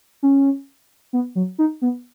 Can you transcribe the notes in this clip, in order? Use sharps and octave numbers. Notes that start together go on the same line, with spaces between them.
C#4
B3
F#3
D#4
B3